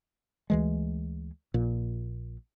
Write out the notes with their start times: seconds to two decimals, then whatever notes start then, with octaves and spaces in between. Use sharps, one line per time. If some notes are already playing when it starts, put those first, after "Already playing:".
0.50 D2 E3 G#3
1.54 A#1 A#2